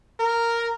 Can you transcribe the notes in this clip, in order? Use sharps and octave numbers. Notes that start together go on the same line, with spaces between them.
A#4